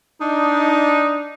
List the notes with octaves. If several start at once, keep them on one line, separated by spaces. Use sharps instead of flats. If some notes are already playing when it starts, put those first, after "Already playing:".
D4 D#4